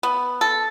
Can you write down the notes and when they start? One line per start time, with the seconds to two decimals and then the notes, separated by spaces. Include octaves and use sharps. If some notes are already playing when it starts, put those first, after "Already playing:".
0.03 B3
0.41 A4